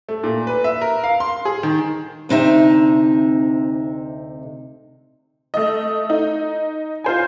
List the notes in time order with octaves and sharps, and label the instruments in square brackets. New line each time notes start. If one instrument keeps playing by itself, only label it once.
[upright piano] A3
A#2
B4
E5
A#4
F5
C6
G#4
D#3
[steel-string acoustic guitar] D2 C3 D#4 E5
[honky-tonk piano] A3 D#5
D#4
F4 C5 G#5